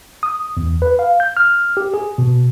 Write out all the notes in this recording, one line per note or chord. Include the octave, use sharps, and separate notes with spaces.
D#6
E2
B4
F5
G6
F6
G4
G#4
B2